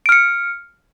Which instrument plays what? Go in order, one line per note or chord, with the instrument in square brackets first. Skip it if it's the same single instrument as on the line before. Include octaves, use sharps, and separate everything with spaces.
[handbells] D7
F6
C#7